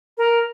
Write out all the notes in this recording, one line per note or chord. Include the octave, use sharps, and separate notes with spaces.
A#4